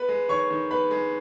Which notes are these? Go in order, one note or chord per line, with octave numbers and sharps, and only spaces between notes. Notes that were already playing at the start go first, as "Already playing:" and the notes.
Already playing: B3 B4 B5
G#3
D#3 C#5 C#6
D#3
B3 B4 B5
G#3